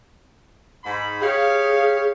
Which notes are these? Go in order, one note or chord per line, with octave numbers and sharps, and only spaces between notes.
G#2 B5
G4 G#4 C#5 F5